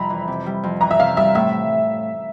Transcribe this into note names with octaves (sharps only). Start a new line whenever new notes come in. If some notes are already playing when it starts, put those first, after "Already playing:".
Already playing: F2 C3 G3 A#5 B5
E3
C3
G3
F2
E3 A#5
E5
C3 F5
G3 E5
A2 E5